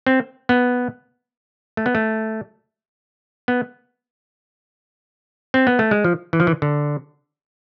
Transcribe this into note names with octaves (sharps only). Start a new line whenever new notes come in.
C4
B3
A3
B3
A3
B3
C4
B3
A3
G#3
F3
E3
F3
E3
D3